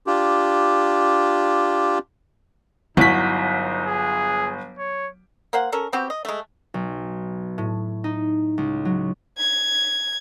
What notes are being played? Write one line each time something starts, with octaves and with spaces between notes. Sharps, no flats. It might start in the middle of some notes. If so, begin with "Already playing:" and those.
D4 F4 G4
G1 F#3 D#4 E4 B6
G#4
C#5
A#3 C5 F#5
C#4 A4 A#4
B3 C4 F#4 G4
D#5
G#3 A3
B1
A2
D#4
C#2
F#3
G#6